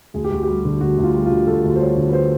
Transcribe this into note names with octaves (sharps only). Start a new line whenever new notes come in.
D2 G#4
G4
D2 F#4
G3 G4
D3
D2 F#4
D2
F4
G3
F4
D3
D2 A4
D2
C5
G3 C#5
D3
B4
C5